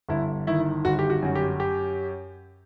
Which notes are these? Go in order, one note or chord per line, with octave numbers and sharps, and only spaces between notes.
G1 E4
D#3 E4
G1 F#4
G4
F#4
F#2 F#4
G4
G4